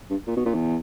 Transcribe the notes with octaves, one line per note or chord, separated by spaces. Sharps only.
G2
A#2
B2
A#2
E2